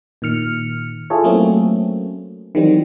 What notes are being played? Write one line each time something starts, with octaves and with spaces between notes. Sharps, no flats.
A#2 D#3 F6 C#7
E4 F4 G#4 A4 C#5
F#3 A3 A#3 C4 C#4
D#3 E3 F#3 G3 C4